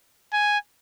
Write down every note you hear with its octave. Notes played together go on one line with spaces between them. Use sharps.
G#5